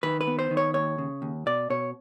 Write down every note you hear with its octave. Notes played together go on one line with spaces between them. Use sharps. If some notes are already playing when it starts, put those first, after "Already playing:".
D#3 B4
B4
B3
C5
D#3
C#5
D#2 C#5
C#3
D#2
B2 D5
B2 C#5